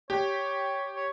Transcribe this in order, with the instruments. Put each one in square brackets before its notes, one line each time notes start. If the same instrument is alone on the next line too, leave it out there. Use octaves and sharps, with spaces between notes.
[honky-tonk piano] G4 [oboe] C#5
[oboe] C#5